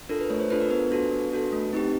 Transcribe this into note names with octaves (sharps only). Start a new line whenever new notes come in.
D4 F4 A4 A#4
B4
A3 C#5
C5
D4 F4 A4 B4
A#4
B3 B4
D4 F#4 A4
B3
D4 F#4 A4
A3
C4 D#4 G4